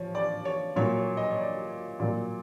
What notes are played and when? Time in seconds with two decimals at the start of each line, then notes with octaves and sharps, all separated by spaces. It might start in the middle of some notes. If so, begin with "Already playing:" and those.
Already playing: F3 C#5
0.15 D5
0.45 C#5
0.76 A#2 F#3 C#5
0.97 C#5
1.17 D#5
1.31 C#5
1.38 D5
2.00 A#2 F#3 D5